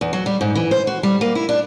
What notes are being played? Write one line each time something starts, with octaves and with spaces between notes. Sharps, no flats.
E2
F#3
G3
G#2
E3
C5
F#4
G3
A#3
E4
D4